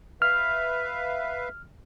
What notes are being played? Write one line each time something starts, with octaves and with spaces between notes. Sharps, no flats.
B4 E5 F5 F6